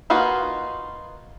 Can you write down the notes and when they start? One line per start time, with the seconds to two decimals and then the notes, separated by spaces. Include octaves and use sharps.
0.10 A#3 D#4 F4 F#4 B4